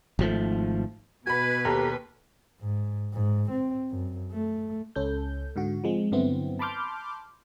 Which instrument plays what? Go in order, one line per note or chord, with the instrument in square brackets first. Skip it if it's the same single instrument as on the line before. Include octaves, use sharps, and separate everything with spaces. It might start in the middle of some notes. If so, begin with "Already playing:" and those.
[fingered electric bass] G#1 F3 A3
[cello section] B2 B4 [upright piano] F#4 B5 [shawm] G#5
[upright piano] D#2 [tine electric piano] G4 A4 A#5
[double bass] G#2
G#2
C4
F#2
A3
[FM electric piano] C#2 C#4 A4 G6
G#2 D3 F#4
F3 G#3 C4
G2 D3 F#3 B3 C4 E4
A5 B5 C6 D6 F6 G6